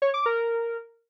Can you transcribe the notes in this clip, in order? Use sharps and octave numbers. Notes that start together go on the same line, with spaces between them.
C#5
D6
A#4